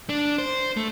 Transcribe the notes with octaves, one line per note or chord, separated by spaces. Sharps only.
D4
C5
A3